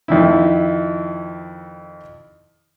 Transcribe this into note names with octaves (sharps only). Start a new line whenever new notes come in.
F2 D#3 E4